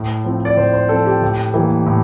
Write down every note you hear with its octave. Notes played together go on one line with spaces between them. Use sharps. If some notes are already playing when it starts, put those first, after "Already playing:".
Already playing: A2
F3 C4
D5
A2 C5
C5
F3 C4 A4
G4
A2
E3 G3 A#3
A2